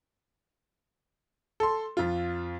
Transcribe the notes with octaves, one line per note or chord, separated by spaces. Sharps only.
A4 C6
F2 F4